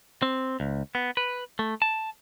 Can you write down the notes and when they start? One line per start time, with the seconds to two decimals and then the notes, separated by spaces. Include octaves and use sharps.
0.22 C4
0.60 C#2
0.95 B3
1.17 B4
1.59 A3
1.82 A5